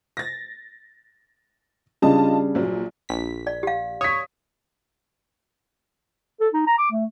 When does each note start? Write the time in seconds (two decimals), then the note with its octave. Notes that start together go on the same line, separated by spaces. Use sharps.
0.17 A6 A#6
2.02 C#3 G3 D4 F4 D#5 A5
2.55 A#1 F#3
3.09 A#1 B6
3.47 D5
3.63 G4 F5
4.01 C#5 D#6 B6
6.40 A4
6.54 D#4
6.67 A#5
6.78 D6
6.91 A3